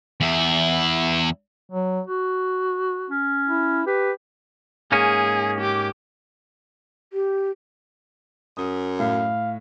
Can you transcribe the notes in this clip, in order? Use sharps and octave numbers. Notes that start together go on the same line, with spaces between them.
E2 E4
F#3
F#4
C#4
E4
G4 B4
G#2 A#3 C#4 G#4
G4 D6
G4
F#2 D#6
A2 F5